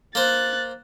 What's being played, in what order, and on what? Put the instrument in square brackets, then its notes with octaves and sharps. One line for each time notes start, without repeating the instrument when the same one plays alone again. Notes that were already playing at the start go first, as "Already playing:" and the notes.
[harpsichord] A#3 C5 [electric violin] F#6 A6